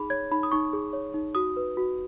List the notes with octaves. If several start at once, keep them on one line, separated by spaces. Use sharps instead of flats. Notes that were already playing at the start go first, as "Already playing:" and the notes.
Already playing: D#4 G#4 B5
C#5 G#6
D#4 B5
D#6
D#4 C#6
G#4
C#5
D#4
F#4 D#6
B4
F#4